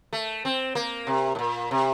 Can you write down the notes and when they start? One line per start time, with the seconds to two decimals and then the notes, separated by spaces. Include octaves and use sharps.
0.13 A3
0.45 C4
0.75 A#3
1.07 C3
1.35 A2
1.39 A#2
1.71 C3